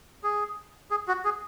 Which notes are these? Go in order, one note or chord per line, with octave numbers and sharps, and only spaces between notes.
G#4
G#4
F#4
G#4